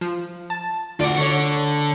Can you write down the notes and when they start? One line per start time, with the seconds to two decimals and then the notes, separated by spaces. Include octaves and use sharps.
0.01 F3
0.50 A5
1.00 D2 F4 D5 F#5 D7
1.18 D3 C#5 C#6